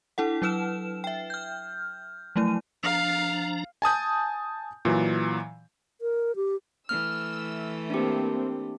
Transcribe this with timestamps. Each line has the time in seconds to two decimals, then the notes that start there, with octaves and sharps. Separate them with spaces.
0.18 D4 E4 A4 F#5
0.42 F#3 E4 B4 F6 E7
1.04 E5 G5
1.30 F6 G6
2.36 F3 F#3 A3 E4 D#7
2.83 F3 D4 F5 A#5
3.82 G#5 A5 D#6 G6
4.85 A#2 E3 F#3
6.01 A#4
6.36 G4
6.89 E3 A3 E6 F6
7.90 A#3 C4 D4 G4